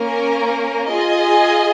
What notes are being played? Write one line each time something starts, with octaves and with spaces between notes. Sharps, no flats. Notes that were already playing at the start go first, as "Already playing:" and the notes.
Already playing: A#3 C#4 A#4
F4 G#4 D#5 G#5